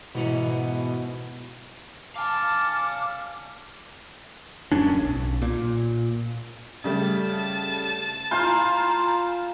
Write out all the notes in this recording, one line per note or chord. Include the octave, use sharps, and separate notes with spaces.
G#2 B2 E3 C#4
F5 G#5 A5 D6 F6
D1 F#2 C#4 D4
B1
A#2
C#3 G3 A3 A5
F4 F5 G#5 A#5 B5 G6